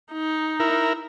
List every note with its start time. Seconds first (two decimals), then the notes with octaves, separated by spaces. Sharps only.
0.12 D#4
0.60 E4 A#4